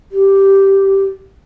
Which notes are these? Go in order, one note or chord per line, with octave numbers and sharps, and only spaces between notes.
G4